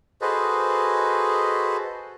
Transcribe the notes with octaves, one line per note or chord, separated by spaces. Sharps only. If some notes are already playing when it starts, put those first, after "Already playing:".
F#4 G#4 A4 B4 C5 D#5